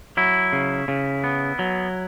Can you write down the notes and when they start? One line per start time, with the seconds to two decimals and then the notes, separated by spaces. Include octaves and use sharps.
0.17 F#3 E4
0.53 C#3
0.88 C#3
1.24 B3
1.59 F#3